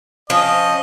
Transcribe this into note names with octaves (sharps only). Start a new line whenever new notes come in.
F3 C#4 D#5